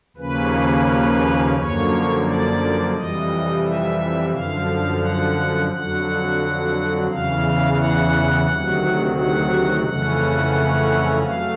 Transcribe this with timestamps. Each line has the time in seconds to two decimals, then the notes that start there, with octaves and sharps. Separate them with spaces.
0.17 D#2 C#3 F3 A#3 C#4 B4
1.55 F#2 D3 F3 A#3 C#5
2.24 D5
2.93 F2 C3 E3 G3 D#5
3.63 E5
4.31 F#2 D3 F3 F5
5.00 F#5
5.69 F2 D3 F#3 F#5
7.08 E2 C#3 E3 F5
7.77 F#5
8.46 D2 C3 D#3 F#3
9.15 F#5
9.84 F2 C#3 E3 A3 C#4 F#5
11.22 F#3 A3 F5